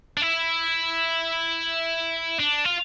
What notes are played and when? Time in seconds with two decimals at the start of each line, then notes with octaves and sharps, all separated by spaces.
0.17 D4
0.22 E4
2.39 D4
2.65 F4